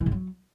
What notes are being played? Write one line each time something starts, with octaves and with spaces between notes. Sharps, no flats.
E3
G#2
F#3